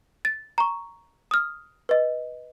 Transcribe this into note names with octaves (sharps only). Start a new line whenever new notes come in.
A6
A#5 C#6
D#6 F6
B4 D#5